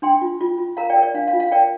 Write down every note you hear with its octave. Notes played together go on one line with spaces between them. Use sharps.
D4 G5 C6
F4
F4
F4
A#4 F5 A#5
D5 G5
A#4
D5
D4 F5
F5
F4
F5
A#4 D5 G5